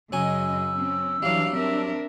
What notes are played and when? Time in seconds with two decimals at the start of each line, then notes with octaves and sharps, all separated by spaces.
0.12 F#2 C#3 F#3 D#5 G#5 E6
0.74 C4 C#4
1.22 E3 F#3 G3 D4 F5
1.54 C4 D4 A#4 E5